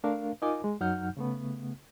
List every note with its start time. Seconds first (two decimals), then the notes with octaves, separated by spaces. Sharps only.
0.04 A3 D4 A#4 F5
0.42 D#4 F4 A#4 D#5 G#5 D6
0.64 G#3
0.81 F#2 F#3 D#4 F#5 F6 G6
1.17 C#3 A3 B3